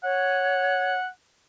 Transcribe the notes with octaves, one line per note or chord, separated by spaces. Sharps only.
C#5 F#5